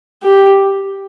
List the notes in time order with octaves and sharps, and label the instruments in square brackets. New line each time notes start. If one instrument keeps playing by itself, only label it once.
[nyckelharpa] G4